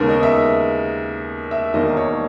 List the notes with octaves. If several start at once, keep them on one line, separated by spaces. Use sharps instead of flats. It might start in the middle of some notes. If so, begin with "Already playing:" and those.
Already playing: D#2 C#3 G#3 B3 A#4
D#5
E5
E5
E1 D#2 D#3 A#3 D#5
C#5